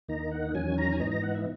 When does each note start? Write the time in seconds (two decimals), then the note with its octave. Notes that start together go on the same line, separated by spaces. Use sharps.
0.08 D#2 D#3 A#3 D#4 A#5
0.31 F#5
0.55 E2 D#3 F#3 C#4 G#5
0.78 A#5
0.93 G#5
1.00 G#2 E3 B3 D#4 A#5
1.12 A#5
1.23 F#5
1.35 E5